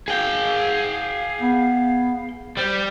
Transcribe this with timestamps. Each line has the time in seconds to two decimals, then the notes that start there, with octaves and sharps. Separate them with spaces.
0.08 G#4 F5 G5
1.41 B3
2.57 G3 C5